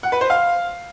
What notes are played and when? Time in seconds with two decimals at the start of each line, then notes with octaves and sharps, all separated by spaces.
0.03 F#5
0.12 B4
0.21 C5
0.30 F5